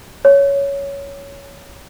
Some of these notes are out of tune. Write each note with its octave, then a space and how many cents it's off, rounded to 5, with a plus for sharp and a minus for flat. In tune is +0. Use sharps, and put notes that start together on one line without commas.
C#5 +10